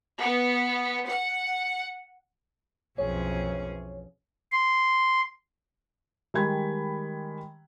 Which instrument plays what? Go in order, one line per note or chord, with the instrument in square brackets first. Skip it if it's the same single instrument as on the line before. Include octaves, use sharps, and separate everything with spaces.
[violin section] B3
F#5
[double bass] B1 E3 [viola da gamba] F2 C#4 G#4 [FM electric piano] C#5
[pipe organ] C6
[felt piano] D#3 G3 G#3 G5 B5 G#6